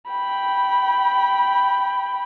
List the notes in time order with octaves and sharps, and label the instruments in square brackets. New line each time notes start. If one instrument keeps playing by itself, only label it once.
[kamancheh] G5 B5